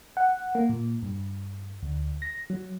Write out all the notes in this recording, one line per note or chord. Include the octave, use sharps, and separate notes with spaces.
F#5
A#3
A#2
G2
D2
A#6
F#3